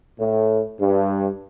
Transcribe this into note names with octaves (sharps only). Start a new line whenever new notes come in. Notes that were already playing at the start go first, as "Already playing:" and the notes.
A2
G2